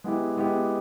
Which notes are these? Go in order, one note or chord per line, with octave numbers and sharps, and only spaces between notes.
G#3 B3 E4 G4
G#3 B3 E4 G4